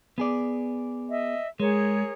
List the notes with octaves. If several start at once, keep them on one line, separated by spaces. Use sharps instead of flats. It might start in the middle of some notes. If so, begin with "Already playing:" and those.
B3 G#4 D5
D#5 E5
G#3 G#4 A#4 C#5